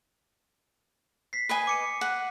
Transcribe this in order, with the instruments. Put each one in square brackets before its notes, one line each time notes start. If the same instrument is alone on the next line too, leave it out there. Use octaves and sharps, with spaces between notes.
[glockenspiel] B6 C7
[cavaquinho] B4 D#5 G#5
[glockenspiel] D6 C#7 D#7
[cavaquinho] F#5